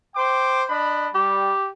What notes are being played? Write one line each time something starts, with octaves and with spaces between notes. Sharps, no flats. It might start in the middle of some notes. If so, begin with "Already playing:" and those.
C5 G5 D6
D4 D#5 B5
G3 G4